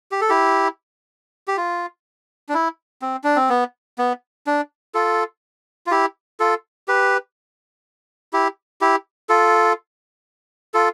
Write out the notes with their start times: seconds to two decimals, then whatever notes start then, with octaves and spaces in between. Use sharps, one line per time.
0.12 G4
0.21 A4
0.29 E4 G4
1.48 G4
1.57 F4
2.49 D4
2.54 E4
3.02 C4
3.24 D4
3.36 C4
3.50 B3
3.98 B3
4.47 D4
4.95 F4 A4
5.87 F4
5.91 E4 G4
6.40 F4 A4
6.88 G4 B4
8.33 E4 G4
8.81 E4 G4
9.29 F4 A4
10.74 F4 A4